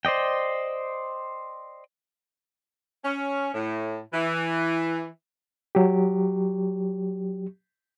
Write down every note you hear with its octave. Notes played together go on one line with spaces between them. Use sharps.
C5 D5 D#5 G5
C#4
A2
E3
F#3 G4